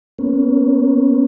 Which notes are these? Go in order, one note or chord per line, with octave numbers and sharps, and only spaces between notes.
A#3 B3 C#4